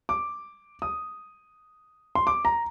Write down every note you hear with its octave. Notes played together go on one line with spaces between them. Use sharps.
D6
D#6
C6
D6
A#5